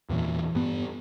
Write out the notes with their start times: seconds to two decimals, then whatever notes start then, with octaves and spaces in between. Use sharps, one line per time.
0.09 E2 A#2 E3
0.55 G2 B3